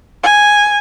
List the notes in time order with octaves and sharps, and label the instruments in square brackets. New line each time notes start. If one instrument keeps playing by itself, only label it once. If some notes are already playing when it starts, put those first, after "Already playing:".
[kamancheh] G#5